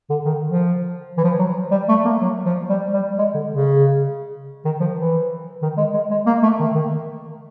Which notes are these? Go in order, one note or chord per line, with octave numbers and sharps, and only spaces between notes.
D3
D#3
F3
E3
F3
F#3
G3
A3
A#3
F#3
F3
G3
G3
G#3
D3
C#3
D#3
F3
E3
D#3
G#3
G#3
G#3
A#3
A3
D#3
D#3